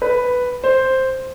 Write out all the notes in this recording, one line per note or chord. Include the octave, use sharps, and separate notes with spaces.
B4
C5